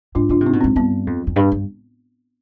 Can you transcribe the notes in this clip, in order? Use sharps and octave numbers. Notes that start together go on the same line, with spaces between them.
G#2 D4 F4
D3 D4 F4
C3
C4 D#4
B2
G#2 C4
G2 B3
F2
F2
G2
G2